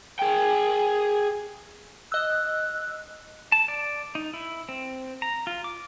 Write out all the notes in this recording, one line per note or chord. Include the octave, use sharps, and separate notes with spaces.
G#4 G5
D#5 E6 F#6
A5
D5
D#4
E4
C4
A#5
F4
D6